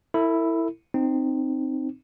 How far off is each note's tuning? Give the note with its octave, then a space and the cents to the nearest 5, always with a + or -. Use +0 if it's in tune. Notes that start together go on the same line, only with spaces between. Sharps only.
E4 +0 A4 +45
C4 +0 D#4 -20